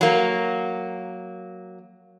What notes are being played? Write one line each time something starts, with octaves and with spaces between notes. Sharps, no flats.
F#3 A#3